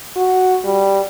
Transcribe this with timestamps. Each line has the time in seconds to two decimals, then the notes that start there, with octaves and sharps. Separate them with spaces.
0.16 F#4
0.65 G3